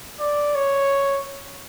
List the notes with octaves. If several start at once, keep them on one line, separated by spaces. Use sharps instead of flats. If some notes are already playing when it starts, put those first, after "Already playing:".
D5
C#5